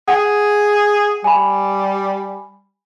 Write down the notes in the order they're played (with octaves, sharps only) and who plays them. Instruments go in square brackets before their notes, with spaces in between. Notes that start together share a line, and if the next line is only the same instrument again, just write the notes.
[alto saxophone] G#4 [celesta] F#5 G5
[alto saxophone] G3 [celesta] G#5 B5